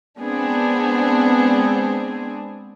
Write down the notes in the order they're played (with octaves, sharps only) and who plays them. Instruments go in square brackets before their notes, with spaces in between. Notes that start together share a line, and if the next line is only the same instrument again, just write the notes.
[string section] G#3 B3 C4 D4 G#4